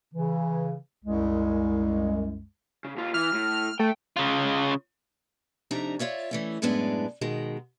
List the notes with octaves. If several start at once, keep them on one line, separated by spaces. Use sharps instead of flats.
C#3 E3
C2 F#2 G#3
C#3
D#2 F4
E3 F6
A2
A3 G5
C#3 F4
F2 C3 D4 D#4 E5 A#5
F4 C#5 D5 E5
E3 A3 C#4
F#2 A2 G#3 B3 D4
B2 D#3 G#3